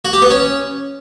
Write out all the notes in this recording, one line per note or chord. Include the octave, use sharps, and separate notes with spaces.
F#4
G4
B3
C#4